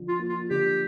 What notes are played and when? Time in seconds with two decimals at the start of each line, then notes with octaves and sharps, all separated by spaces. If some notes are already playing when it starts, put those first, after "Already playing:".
Already playing: D3 F3
0.08 F4
0.19 A#3
0.29 F4
0.50 D3 G4